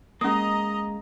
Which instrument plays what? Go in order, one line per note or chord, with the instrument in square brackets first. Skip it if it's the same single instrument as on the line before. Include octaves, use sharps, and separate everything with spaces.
[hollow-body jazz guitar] G#3 A#3 [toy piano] C#4 D#6 [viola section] D#5 A#5